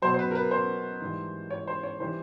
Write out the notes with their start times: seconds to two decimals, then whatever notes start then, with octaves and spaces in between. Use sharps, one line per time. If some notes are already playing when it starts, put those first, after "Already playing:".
0.02 B2 F#3 C5
0.14 C5
0.19 B4
0.31 A#4
0.35 B4
0.51 C5
1.00 G#2 E3 G3
1.50 C#5
1.67 C5
1.83 C#5
2.00 E3 G3 C5